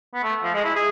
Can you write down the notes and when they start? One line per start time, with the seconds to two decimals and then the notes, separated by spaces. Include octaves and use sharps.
0.14 B3
0.23 A3
0.44 F3
0.55 G#3
0.64 E4
0.75 G#4